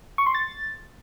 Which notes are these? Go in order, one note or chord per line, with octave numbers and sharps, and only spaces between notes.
C#6
C6
A6